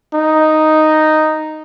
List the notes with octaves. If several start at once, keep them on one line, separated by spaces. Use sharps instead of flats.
D#4